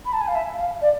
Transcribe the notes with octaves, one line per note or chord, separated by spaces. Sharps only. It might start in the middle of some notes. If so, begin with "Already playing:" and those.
B5
A5
G#5
F5
E5
F5
D5